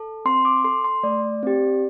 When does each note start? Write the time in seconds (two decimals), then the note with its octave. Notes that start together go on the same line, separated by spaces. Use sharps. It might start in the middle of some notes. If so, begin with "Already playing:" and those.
Already playing: A4
0.25 C4 C6
0.45 D6
0.64 A4 C6
0.85 C6
1.03 A3 D5
1.43 C4 G4